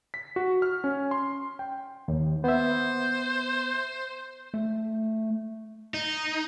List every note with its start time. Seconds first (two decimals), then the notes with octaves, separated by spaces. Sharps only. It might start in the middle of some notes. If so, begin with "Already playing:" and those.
0.14 B6
0.36 F#4
0.62 F6
0.84 C#4
1.11 C6
1.59 G5
2.08 D#2
2.44 B3 C5 E5
4.54 A3
5.94 D#4